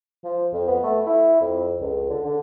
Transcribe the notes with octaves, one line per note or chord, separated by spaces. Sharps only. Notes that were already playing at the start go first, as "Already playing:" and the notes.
F3
F2
B3
A3
E4
F2
C#2
D3
D3